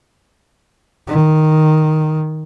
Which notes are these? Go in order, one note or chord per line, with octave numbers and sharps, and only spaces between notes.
D#3